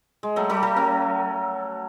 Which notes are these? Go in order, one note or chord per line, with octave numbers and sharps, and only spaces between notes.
G#3
F#3 A3
F#3 A3
F#3 A3
A3 C#4